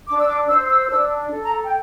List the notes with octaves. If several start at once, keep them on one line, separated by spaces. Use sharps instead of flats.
D4 D6
E6
D6
C5 E6
E6
D4 E6
A4
A#5
G5